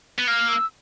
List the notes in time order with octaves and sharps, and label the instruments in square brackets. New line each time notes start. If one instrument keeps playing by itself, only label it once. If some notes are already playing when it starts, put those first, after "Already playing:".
[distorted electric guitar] B3
[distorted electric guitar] A#3 [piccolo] F6
[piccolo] E6